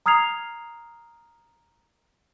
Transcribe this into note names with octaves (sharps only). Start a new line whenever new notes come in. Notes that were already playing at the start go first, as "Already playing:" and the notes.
A#5 D#6 F6 G#6 C7 F7